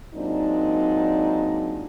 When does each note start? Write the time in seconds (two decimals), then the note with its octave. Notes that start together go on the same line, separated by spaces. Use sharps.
0.14 A#2 F#3 G#3 C4 D4 D#4